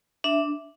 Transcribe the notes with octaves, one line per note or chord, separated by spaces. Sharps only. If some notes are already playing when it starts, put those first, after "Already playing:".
D4 E5